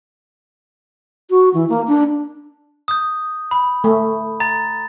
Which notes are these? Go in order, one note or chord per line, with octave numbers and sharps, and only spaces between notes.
F#4
E3
A#3
D4
D#6 G6
B5
A3
A#5 A6